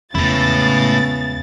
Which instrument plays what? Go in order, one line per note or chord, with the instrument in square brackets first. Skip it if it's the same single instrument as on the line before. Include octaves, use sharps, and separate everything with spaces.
[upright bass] E2 G#3 [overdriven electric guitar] A2 E4 [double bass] C#3 B3 [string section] A6